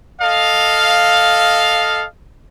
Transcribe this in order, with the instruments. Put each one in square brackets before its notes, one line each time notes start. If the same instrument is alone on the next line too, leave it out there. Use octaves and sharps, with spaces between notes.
[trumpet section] A4 D#5 F5